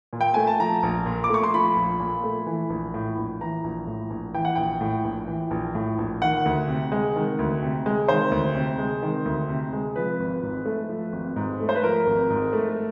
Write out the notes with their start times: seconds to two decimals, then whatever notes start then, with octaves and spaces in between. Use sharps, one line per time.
0.13 A#2
0.21 G5
0.34 A3 G#5
0.47 A5
0.60 F3 A#5
0.83 A#1
1.06 A#2
1.24 D6
1.29 A3 C#6
1.44 C6
1.54 F3 B5
1.76 A#1
2.00 A#2
2.24 A3
2.46 E3
2.70 A#1
2.94 A2
3.18 A#1
3.41 E3 A#5
3.64 A#1
3.87 A2
4.10 A#1
4.34 E3 G5
4.45 F#5
4.55 A#1 G5
4.81 A2
5.05 A#1
5.27 E3
5.51 A#1
5.75 A2
5.98 A#1
6.22 D#3 F#5
6.46 D2
6.68 C3
6.92 G#3
7.16 D#3
7.39 D2
7.62 C3
7.86 G#3
8.08 D#3 C5
8.32 D2
8.55 C3
8.78 G#3
9.02 D#3
9.25 D2
9.49 C3
9.73 G#3
9.96 F3 B4
10.20 G#1
10.43 G#2
10.66 A3
10.89 F3
11.12 G#1
11.36 G#2
11.60 A3
11.69 C5
11.75 B4
11.83 F3 A#4
12.07 G#1
12.30 G#2
12.53 A3